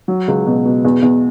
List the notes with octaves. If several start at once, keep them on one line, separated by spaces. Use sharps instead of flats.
F#3
C#2
B2
B2
E2
E2